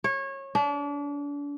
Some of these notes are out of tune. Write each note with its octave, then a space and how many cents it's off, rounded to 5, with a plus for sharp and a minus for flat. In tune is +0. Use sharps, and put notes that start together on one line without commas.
C#5 -25
D4 -35